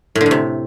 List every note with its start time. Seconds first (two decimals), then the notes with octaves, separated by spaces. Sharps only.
0.15 A2
0.21 D3
0.26 A2
0.31 C3